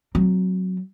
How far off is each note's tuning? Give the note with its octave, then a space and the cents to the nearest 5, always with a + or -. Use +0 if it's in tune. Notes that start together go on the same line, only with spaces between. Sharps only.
F#3 +0 C4 +0